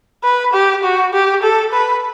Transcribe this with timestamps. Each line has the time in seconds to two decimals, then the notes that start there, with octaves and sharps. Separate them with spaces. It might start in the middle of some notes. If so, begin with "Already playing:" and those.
0.24 B4
0.53 G4
0.83 F#4
1.13 G4
1.43 A4
1.73 B4